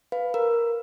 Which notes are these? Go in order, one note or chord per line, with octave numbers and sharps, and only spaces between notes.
B4 F5
A#4